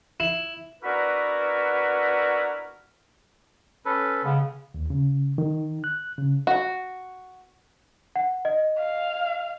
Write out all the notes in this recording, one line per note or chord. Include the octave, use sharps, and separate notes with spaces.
E4
B3 D4 E4 F#4 A#4 B4
C#4 A4 B4
C#3 G#3 B3
D#2
C#3
D#3
F#6
C#3
F#4
F#5
D#5
F5